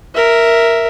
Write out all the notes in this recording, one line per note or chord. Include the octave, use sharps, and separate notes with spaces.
A#4 E5